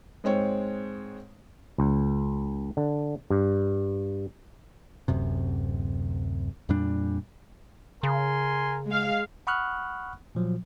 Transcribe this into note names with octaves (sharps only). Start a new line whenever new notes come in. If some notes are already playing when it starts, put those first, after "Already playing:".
G#2 G#3 C4 C#5
C#2
D3
G2
D1 F#2 C3
F2 A#2 G3 D4
C#3 A#4 G#5 C6
G#3 F5
F#5 B5 C#6 D#6 F6 F#6
A#2 F3 F#3